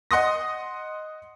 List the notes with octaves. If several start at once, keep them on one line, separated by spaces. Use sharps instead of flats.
D#5 F#5 C6 D#6 A#6